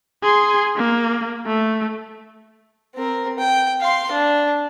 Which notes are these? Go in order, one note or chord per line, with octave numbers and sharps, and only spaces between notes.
G#4 C6
A#3
A3
C4 A#4
G5
F5 C6
D4